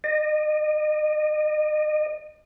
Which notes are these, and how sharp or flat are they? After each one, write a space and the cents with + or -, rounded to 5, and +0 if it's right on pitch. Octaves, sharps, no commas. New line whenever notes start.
D#5 -35